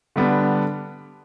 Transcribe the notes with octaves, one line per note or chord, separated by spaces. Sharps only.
D3 G3 B3 D4